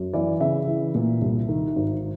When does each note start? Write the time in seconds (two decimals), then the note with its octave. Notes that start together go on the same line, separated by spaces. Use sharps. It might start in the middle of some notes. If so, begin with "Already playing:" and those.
Already playing: F#2
0.13 E3 D5
0.40 C#3 E5
0.67 E3
0.95 A#2
1.22 C2
1.49 D#3
1.76 G#1